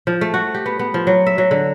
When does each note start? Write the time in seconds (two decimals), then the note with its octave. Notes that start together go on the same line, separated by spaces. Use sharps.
0.07 F3
0.21 A3
0.34 F#4
0.54 G4
0.66 B3
0.79 B3
0.94 F3
1.07 F#3
1.26 E5
1.38 F#3
1.51 D3